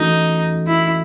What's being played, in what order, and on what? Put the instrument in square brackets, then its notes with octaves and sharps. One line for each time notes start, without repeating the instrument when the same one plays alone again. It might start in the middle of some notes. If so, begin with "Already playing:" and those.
Already playing: [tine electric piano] E3 A3 C#4 F#4 A4 [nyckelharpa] D#4
[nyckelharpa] E4